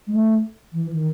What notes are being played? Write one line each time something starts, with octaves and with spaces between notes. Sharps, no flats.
G#3
A3
E3
D#3